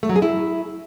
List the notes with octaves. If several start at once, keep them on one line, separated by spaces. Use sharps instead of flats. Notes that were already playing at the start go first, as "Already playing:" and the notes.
A3
F#3
G#4
E4